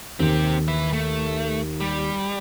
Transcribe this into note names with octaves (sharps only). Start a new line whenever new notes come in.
D#2 C4 G4
B4 E5
A3
G3